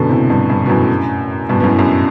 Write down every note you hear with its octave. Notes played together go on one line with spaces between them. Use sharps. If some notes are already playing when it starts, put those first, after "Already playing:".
Already playing: F#2 B2 D3
A2 C3
G2
G2
B2
F#2 A2
G2 B2
B2
F#2 A2
F#2